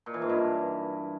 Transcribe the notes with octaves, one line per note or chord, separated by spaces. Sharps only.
A#2
E3
G#2
G2